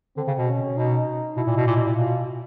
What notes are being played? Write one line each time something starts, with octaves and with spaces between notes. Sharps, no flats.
D3 C4
C#3
B2
C#4
B2 D#4
B2 E4
A#2
B2
A#2 E4
B2
A#2
B2 F4